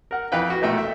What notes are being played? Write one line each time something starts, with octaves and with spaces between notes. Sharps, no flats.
A#4 F#5
F2 E3 B4 F5 G5
F#4
B1 A#2 A3 G5
E5